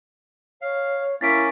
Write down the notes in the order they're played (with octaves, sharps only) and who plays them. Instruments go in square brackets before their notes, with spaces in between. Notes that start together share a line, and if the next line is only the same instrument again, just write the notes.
[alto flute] C#5 [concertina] F5
[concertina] A#3 C#4 [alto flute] E4 [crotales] A6 B6 D7